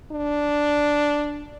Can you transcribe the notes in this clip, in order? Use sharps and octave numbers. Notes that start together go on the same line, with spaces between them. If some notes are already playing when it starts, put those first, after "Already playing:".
D4